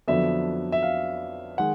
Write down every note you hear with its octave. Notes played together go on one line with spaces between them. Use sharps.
F2 D3 F#3 B3 E5
E5
F5
D#3 G#3 F#5